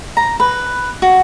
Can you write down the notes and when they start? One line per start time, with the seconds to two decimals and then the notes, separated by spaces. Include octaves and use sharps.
0.17 A#5
0.40 B4
1.02 F#4